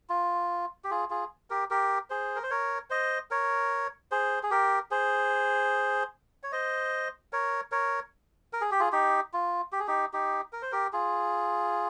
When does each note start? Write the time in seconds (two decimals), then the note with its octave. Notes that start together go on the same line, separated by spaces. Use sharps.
0.09 F4
0.84 G4
0.91 F4 G#4
1.10 F4 G#4
1.50 G4 A#4
1.70 G4 A#4
2.10 G#4 C5
2.36 A#4
2.43 C5
2.50 A#4 C#5
2.90 C5 D#5
3.31 A#4 C#5
4.11 G#4 C5
4.43 G#4
4.51 G4 A#4
4.91 G#4 C5
6.43 C#5
6.52 C5 D#5
7.33 A#4 C#5
7.72 A#4 C#5
8.53 A#4
8.61 G#4
8.71 G4
8.80 F4 G#4
8.92 D#4 G4
9.33 F4
9.72 G4
9.80 G#4
9.87 D#4 G4
10.13 D#4 G4
10.53 A#4
10.62 C5
10.72 G4 A#4
10.93 F4 G#4